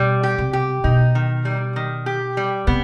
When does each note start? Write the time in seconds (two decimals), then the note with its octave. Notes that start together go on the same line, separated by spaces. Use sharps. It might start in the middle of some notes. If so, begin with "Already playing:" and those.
Already playing: B2 G3
0.23 G4
0.38 C3
0.53 G4
0.84 B2 D#4
1.15 D#3
1.45 G3
1.76 D#3
2.06 G4
2.37 G3
2.67 C3 B3